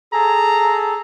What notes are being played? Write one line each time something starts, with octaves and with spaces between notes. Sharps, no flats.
G#4 A4 A#5